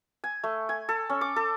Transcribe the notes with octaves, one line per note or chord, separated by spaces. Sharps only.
G#5
A3
G#5
A4
C#4
D6
A4